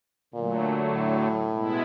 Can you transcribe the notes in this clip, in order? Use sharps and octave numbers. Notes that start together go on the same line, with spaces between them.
A#2 D3 F#3 A3
A2
B2 G#3 B3 E4